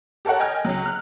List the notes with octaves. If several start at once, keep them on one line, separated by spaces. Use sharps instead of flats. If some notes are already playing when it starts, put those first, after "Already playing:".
G4 A4 A#4 C#5 F#5
D#5 G5 G#5 F6
C#2 F#3
F6 F#6